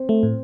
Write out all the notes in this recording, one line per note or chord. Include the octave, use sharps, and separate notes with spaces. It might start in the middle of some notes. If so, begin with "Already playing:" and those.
Already playing: C4
A3
A2